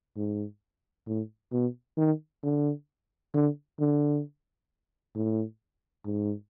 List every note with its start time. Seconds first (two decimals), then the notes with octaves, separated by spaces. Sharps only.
0.17 G#2
1.07 A2
1.52 B2
1.98 D#3
2.43 D3
3.34 D3
3.80 D3
5.15 A2
6.05 G#2